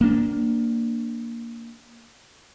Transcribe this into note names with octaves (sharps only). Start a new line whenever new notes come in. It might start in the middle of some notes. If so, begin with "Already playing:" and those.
A#3 D4